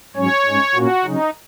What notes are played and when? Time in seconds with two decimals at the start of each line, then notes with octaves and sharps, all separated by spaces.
0.16 G#2 F#3 C#4 C#5
0.46 G#2 G#3 C#4
0.75 A#2 A#3 C#4 F#4
1.04 C#3 F#3 C#4 D#4